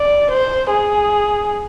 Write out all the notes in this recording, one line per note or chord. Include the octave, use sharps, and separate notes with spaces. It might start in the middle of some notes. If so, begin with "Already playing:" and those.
Already playing: D5
C5
G#4